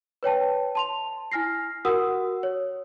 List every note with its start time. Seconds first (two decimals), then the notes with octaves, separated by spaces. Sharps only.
0.23 B4 C#5 G5 A5
0.75 A5 C6 F7
1.32 E4 G#5 F6 A#6 C7
1.85 F#4 G4 A#4 F#5 D#6 E6
2.43 C#5